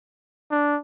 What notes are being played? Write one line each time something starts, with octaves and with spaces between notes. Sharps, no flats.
D4